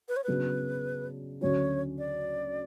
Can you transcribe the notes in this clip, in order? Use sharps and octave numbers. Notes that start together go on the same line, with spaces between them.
B4
C#5
C#3 F#3 B3 D4 F#4 B4
D2 D3 F#3 C#4 F#4 C#5
D5